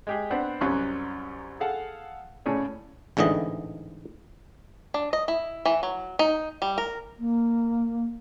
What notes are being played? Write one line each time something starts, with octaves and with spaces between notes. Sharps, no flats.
G#3 G4 G#4
B3 C4 D4 F#5
C2 F#2 C#4 C6 C#6 F#6
G#4 A4 F5 F#5 A5
A2 C#3 C#4 G#4 C#5 D5
A1 G#2 D3 E3 D#5
D4
D#5
E4
E3
F#3
D#4
G3
A#4
A#3